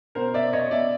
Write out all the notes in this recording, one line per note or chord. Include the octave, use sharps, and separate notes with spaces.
B2 A#4 C5
B2 D5 E5
B2 C#5 D#5
B2 D5 E5